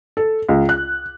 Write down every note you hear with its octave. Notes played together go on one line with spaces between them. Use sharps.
A4
C#2
F#6